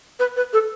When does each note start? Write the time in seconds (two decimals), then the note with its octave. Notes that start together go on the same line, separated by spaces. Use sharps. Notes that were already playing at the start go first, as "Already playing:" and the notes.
0.19 B4
0.37 B4
0.53 A4